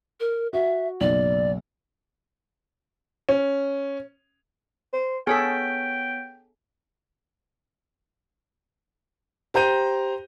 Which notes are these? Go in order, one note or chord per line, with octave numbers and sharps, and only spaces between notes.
A#4
F#4 E5
F#1 B1 D5 F#7
C#4
C5
B3 G#4 A4 C#5 G5 B6
G4 C5 A#5 G6 D#7